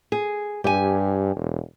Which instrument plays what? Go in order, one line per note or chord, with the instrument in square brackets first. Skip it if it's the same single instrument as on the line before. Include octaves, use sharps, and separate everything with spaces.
[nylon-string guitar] G#4
[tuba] G2 [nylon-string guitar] G4 G#5
[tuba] E1